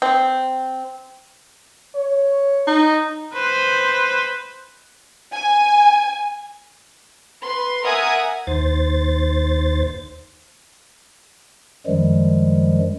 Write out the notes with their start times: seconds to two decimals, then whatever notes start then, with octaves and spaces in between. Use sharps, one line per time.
0.02 C4
1.95 C#5
2.67 D#4
3.34 B4 C5
5.33 G#5
7.44 B4 C6
7.84 A#4 E5 F#5 G#5 A#5 D#6
8.47 D#2 C5 A6
11.87 F#2 D#3 F3 G3 G#3